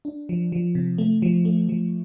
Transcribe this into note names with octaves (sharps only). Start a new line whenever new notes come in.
D4
F3
F3
C3
A3
F3
A3
F3